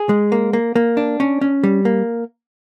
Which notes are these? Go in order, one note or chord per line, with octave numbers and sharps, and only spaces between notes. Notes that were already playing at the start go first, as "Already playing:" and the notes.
Already playing: G#4
G#3
A#3
A#3
A#3
D4
C#4
C#4
G3
A#3